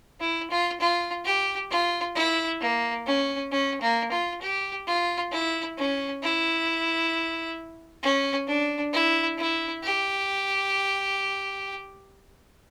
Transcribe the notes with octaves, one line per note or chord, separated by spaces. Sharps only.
E4
F4
F4
G4
F4
E4
A#3
C#4
C#4
A#3
F4
G4
F4
E4
C#4
E4
C#4
D4
E4
E4
G4